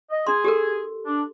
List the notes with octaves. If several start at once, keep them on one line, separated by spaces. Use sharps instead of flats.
D#5
D4 G#4 C6
G4 A4 A#4
D4